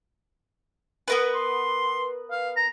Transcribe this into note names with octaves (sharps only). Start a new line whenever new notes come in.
B3 A#4 B4
C6
F5
A#5